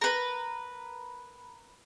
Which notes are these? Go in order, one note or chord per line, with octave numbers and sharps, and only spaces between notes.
A#4 B4